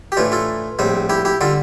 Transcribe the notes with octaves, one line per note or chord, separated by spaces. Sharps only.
G4
A2 E3 A3 D4 F4
F4 A4
A#1 A2 G3 C4
E4 G4
E4 G4
D3 G3 F4 A4